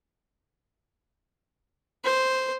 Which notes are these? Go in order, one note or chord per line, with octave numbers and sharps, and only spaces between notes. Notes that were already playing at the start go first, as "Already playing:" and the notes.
C5